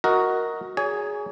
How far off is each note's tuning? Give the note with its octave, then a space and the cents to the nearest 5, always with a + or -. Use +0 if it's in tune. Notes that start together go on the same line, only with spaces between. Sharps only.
F#4 +0 A#4 +0 D#5 +25
G#4 +0 C#5 +40 G#5 +0